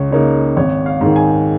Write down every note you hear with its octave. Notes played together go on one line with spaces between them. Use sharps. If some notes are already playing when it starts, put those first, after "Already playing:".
Already playing: C#2 C#5
C#3 A#3 D#4 C#5
G#1 C#5
F5
G#2
D#3
G#5